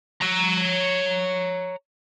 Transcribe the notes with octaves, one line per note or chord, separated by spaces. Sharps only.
C#5 A#5